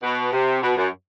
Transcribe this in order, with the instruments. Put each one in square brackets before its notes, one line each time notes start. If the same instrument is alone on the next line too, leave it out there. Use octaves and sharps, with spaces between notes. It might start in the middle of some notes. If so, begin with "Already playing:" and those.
[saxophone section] B2
C3
B2
F#2